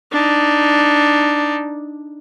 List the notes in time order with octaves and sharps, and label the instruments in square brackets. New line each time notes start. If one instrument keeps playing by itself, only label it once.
[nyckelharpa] D4 D#4